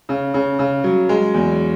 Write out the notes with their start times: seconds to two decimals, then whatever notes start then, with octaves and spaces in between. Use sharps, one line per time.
0.09 C#3
0.34 C#3
0.59 C#3
0.84 F#3
1.09 G#3
1.34 E2